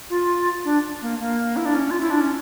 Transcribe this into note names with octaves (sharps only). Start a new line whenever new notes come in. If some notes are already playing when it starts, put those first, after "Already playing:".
F4
D4
A#3
A#3
E4
D4
C#4
F4
E4
D4
C#4